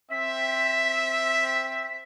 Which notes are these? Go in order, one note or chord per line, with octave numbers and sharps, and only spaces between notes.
C4 E5 B6